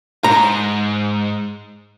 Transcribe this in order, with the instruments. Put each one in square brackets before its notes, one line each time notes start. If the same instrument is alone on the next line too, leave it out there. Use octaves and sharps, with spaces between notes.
[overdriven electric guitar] G#2 [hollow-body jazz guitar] A#5